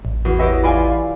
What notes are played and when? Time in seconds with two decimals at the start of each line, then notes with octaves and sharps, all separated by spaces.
0.05 A1
0.25 E2 F#4
0.39 G4 B4 C#5 D#5 E5
0.63 F4 D5 F5 G#5 B5